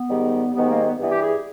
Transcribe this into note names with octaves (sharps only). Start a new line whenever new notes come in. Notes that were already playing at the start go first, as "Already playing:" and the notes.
Already playing: B3
G#2 D#3 G3
G#2 D#3 G3 B3
A#3
B3
G2 E3 G3 B3
G4
G#4